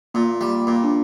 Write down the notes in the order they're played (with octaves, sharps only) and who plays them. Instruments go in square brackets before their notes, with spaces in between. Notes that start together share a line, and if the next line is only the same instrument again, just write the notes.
[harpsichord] A#2 [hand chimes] A#3
[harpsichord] G3
A#2
[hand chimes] D4